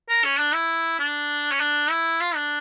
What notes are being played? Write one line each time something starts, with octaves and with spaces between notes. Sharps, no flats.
A#4
C#4
D4
E4
D4
C#4
D4
E4
F4
D4